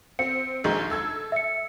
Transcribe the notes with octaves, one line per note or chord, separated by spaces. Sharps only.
C4 C#7
A#1 D#3 G#3
A4 E6 G#6
E5 C#7